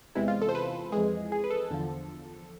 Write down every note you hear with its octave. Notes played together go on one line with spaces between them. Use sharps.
E2 C3 E3 G#3 E4
F4
A4
C5
B4
F2 E3 G#3 G#4
G#4
B4
A4
E2 D3 F3